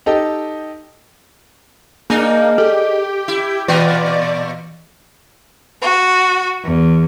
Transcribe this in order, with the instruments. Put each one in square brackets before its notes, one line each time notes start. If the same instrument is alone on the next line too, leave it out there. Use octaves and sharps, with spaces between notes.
[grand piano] D#4 G4 A4 D#5
[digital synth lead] A#3 [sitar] D4 D#4 G#4
[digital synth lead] G4 [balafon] A4
[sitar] E4
[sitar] A#2 B3 F4 [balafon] E3 G5 [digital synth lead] D5
[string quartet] F#4
E2